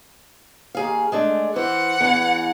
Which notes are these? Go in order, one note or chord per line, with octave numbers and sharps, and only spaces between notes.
D#2 G#4 F5
G#3 A3 D4
E3 C5 F#5
E2 E3